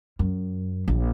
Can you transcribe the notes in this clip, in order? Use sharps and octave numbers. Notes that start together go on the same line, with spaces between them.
F#2
A#1